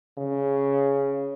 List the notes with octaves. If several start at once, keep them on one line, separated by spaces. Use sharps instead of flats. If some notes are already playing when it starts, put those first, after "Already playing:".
C#3